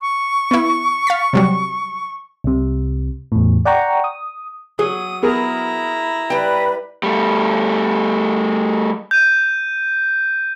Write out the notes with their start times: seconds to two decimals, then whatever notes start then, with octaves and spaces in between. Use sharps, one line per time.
0.01 C#6
0.51 B3 E4
1.07 F5 A6 B6
1.33 C3 F#3 G3
2.44 C2 C3
3.32 E2 A2
3.65 D5 F#5 G5 A#5 C#6
4.04 D#6
4.79 F#3 G#4 D#6
5.23 B3 E4 G#4 A#4 A#5
6.30 G3 B4 G5
7.03 G3 A3
9.11 G6 D#7